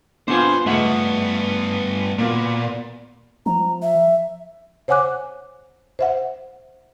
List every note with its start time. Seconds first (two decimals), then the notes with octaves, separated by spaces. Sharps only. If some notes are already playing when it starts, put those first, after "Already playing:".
0.28 B3 C4 D4 F4 A4 C5 G#5
0.66 G2 G#3 A3 B3 E5 F#5
2.18 A#2 A#3 B3
3.46 F3 A#5
3.82 E5
4.88 C5 C#5 F#5 G#5 D6 F#6
5.99 C5 E5 F#5